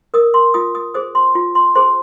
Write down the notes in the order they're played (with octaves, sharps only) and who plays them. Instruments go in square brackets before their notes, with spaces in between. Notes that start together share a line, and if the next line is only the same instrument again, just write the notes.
[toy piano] A#4 D#6
C6
F4 D#6
D#6
G#4 C5 D#6
C6
F4
C6
G#4 C5 C6